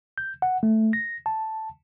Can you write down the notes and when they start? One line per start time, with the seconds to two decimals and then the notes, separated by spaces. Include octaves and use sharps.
0.18 G6
0.42 F#5
0.63 A3
0.93 A#6
1.26 A5